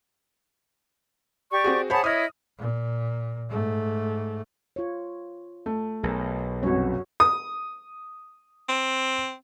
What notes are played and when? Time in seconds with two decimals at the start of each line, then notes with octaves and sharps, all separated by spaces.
1.51 G4 D5 C#6
1.64 C4 F#4 G#4
1.90 G#4 C5 C#5 F#5 A5 B5
2.04 E4 C#5 D#5 D#6 F6
2.58 A#2
3.50 G#2 A3
4.76 F4 C#5
5.66 A3
6.03 B1 G#4 A#4
6.63 C2 F#2 F#4 C#5
7.20 D#6
8.69 C4